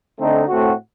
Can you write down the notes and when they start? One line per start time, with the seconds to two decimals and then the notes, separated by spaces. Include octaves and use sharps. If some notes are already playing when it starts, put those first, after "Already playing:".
0.19 D3 A3 C4 D#4
0.48 A2 A3 C4 F#4